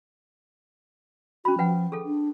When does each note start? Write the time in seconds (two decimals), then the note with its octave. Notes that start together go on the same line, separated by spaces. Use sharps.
1.45 C#4 F#4 B5
1.59 F3 B4 F#5 G5
1.92 G#4 A4
2.05 D4